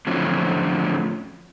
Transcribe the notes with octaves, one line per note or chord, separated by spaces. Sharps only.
A2 D3 F3 F#3 C4 C#4